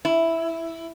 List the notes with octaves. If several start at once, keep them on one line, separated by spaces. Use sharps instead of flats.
E4